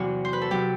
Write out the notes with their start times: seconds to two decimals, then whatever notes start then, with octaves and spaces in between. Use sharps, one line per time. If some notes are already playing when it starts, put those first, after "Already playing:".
Already playing: E2 C3 F#3 F#4
0.25 C5
0.33 B4
0.42 A4
0.51 C3 F#3 G4